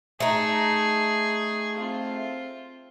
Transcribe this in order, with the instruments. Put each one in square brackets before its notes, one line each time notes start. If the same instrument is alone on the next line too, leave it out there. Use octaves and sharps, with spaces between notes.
[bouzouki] A3 D#4 [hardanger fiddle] G#4
[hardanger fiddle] C4 F4